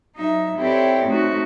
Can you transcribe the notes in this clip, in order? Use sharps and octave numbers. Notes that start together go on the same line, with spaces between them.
F#3 D#4 E5
C4 E4 G4 A4 C#5 D5
A3 C4 D#4 F#4